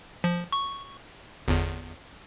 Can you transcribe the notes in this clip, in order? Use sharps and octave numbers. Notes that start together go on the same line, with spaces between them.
F3
C#6
G1 E2